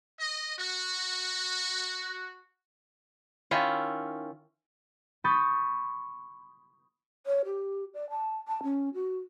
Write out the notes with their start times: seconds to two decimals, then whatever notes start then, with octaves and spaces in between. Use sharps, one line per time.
0.19 D#5
0.58 F#4
3.51 D#3 C#4 E4 F4
5.24 B5 C#6 D#6 G6 A6 B6
7.26 C#5
7.45 G4
7.94 D5
8.10 A5
8.48 A5
8.63 C#4
8.94 F#4